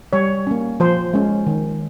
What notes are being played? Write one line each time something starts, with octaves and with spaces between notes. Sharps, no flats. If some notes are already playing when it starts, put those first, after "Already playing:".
G3 C#5
A#3 C#4
F3 C5
G#3 C#4
D#3